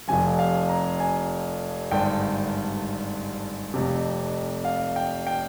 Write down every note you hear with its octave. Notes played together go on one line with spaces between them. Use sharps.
F1 F2 C3 F3 G#5
F5
A#5
G#5
G#1 G2 D3 G5
F1 F2 C3
F5
G5
G5